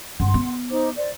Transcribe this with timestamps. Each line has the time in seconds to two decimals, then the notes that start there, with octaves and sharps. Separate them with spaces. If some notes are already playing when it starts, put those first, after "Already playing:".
0.20 G2 F#5 C6
0.34 B3
0.70 D#4 C5 D6
0.96 C5 D5